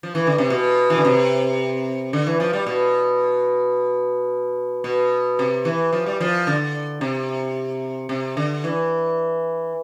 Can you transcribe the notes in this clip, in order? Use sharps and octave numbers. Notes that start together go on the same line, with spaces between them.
F3
E3
D3
C3
B2
E3
D3
C3
D3
E3
F3
G3
B2
B2
C3
E3
F3
G3
F3
D3
C3
C3
D3
E3